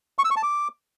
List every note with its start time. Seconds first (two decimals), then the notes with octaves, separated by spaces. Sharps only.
0.19 C#6
0.25 E6
0.31 C#6
0.37 A5
0.43 D6